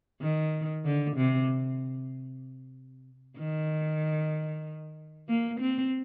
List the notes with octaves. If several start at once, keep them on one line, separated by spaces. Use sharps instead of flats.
D#3
D3
C3
D#3
A#3
C4